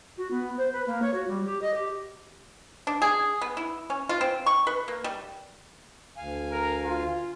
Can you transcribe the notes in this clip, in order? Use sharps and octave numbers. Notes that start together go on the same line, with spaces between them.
F#4
B3
C5
B4
A#3
C#5
F#4
G3
G4
D#5
G4
D4
G#4
B3
E4
C#4
F4
C4
C#6
B4
A#3
G3
D2 F5 G#5
A#4
F4